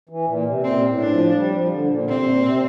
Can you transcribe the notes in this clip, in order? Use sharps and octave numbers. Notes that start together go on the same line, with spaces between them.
E3
A#2
C3
A#2 C4
A2
D4
F3
G3
F3
D3
A#2
C3 C4
C3
A#2
C3